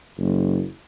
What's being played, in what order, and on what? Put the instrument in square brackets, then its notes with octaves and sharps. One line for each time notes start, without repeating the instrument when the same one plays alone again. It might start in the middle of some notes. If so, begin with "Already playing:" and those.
[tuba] F#1